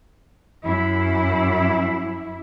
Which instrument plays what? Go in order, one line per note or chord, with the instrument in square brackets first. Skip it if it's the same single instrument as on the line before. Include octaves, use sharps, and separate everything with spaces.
[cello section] F#2 E4